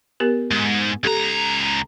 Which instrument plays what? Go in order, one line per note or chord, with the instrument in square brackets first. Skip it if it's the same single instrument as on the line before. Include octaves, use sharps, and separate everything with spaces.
[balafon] B3 G4 A#4
[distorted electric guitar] G#2
[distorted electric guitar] C#2 A#5 [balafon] G4 A4